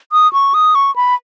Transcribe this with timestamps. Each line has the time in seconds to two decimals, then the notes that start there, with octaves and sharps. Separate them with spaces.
0.12 D#6
0.33 C#6
0.54 D#6
0.75 C#6
0.96 B5